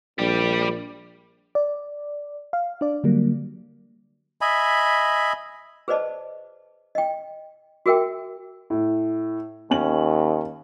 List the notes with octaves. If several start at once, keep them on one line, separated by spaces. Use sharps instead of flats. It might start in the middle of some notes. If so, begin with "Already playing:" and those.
A#1 G3 G4
D5
F5
D4 D5
D3 F#3 G3 A#3
D#5 E5 G#5 B5
G#4 B4 C5 D5 D#5 A5
D#5 G5
F#4 G#4 A#4 E5 G5
A2
D#2 C#4 F#7